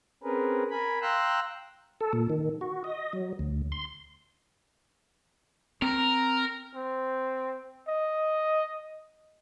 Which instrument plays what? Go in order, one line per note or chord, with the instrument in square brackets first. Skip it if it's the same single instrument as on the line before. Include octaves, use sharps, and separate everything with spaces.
[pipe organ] C4 C#4 G#4 A#4 B4
A#4 G#5 B5
F5 G5 A#5 C6 E6 F#6
[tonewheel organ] A4
A#2
D#3
F#4
D#5
F#3
D2
C6
[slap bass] C4 [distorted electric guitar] A#4
[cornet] C4
D#5